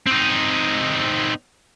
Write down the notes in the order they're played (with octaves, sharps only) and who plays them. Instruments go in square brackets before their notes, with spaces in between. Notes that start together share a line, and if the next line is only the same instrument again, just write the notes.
[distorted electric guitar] C4 D#4